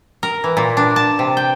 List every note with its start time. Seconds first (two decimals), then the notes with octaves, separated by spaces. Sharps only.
0.23 A#4
0.44 E3
0.57 A#2
0.77 D4
0.96 A5
1.19 C3
1.37 G5